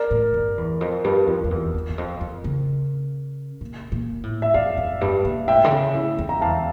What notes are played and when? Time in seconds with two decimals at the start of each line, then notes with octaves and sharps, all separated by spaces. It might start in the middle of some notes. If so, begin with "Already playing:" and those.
Already playing: A#4 D5
0.11 A2
0.34 G2
0.58 E2
0.81 F2
1.04 G2
1.27 F2
1.44 F2
1.51 E2
1.74 E2
1.89 G2
1.98 F2
2.21 F2
2.44 C#3
3.61 A#2
3.92 A#2
4.23 A2
4.42 E5
4.54 F2 D5 F5
4.77 F2
5.01 G2
5.25 A#2
5.47 A2 E5 G5
5.64 D3
5.71 C#3
5.94 A2
6.19 F2
6.29 A#5
6.41 E2 F5 A5